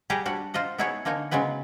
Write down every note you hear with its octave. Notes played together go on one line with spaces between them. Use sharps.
G3 G4 G#4 F#5 G#5 A#5
G3 D4 F#4
F4 C5 D#5 F#5
B3 D#4 E4 F#4 G#4 C#5
D3 A#3 D#4 C#5 G#5
C#3 F#3 G#3 B3 B4